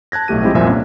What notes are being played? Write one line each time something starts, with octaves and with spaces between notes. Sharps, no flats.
A5 F#6 G#6 A#6
B1 A2 A3 G4 D#7
F3 G#3 C4 E4 G4 D#5
C2 F2 A#2 F3 E5 G#5
A#3 C#4 D4